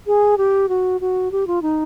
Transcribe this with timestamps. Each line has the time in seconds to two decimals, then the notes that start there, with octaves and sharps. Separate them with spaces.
0.07 G#4
0.38 G4
0.69 F#4
1.01 F#4
1.32 G4
1.47 F4
1.62 D#4